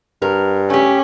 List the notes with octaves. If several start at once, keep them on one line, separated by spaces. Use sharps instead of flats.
G2 A#4
A3 C#4 G4